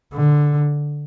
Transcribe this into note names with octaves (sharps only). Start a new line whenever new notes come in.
D3